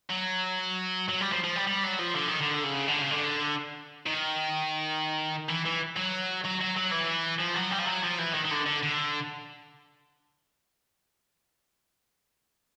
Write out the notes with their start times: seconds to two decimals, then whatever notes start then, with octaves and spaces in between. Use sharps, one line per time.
0.10 F#3
1.09 F#3
1.21 G3
1.32 F3
1.43 F3
1.56 G3
1.67 G3
1.84 F#3
1.99 F3
2.15 D3
2.28 D#3
2.39 D3
2.63 C#3
2.88 D3
3.02 C#3
3.11 D3
4.06 D#3
5.49 E3
5.65 E3
5.96 F#3
6.44 F#3
6.61 F#3
6.77 F#3
6.91 E3
7.40 F3
7.56 F#3
7.72 G3
7.79 F3
7.86 F#3
8.03 F3
8.18 E3
8.34 D#3
8.45 D#3
8.51 D3
8.66 D3
8.83 D3